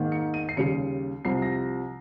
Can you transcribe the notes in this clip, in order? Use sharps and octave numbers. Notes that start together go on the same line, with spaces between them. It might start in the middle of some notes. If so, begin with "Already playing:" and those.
Already playing: G#2 D#3 A#3
C#7
D#7
C7
D#2 C#3 G3 C#7
C2 C3 F3 C7
A#6